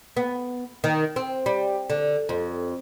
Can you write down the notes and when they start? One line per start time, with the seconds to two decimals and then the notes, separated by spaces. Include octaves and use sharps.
0.17 B3
0.84 D#3
1.16 C4
1.46 G3
1.90 D3
2.29 F2